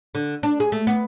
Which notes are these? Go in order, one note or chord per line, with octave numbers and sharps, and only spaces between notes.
D3
D4
G#4
A3
B3